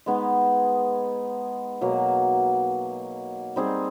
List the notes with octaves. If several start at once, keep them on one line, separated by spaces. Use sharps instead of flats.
G#3 B3 D#4
B2 F#3 A#3
G3 C4 D#4 G#4